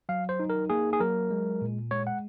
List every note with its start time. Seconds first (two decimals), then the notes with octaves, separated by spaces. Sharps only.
0.09 F#3 F5
0.29 C5
0.40 D#4
0.50 A#4
0.70 A#3 G#4
0.93 G#4
1.00 F#3 A#4
1.30 G#3
1.62 A#2
1.91 G#3 C#5
2.07 F#5